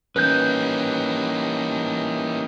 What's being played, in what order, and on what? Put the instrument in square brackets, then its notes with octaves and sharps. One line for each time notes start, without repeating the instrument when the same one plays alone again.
[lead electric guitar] E3 C#4 [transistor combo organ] G3 A#3 D#4 [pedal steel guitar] B4 G6